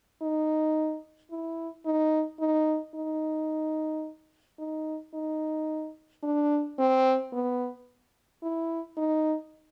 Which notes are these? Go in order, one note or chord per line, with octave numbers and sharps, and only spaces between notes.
D#4
E4
D#4
D#4
D#4
D#4
D#4
D4
C4
B3
E4
D#4